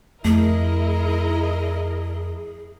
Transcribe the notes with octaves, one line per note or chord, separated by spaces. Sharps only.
F2 A3 E4 G#4 A#4 D#5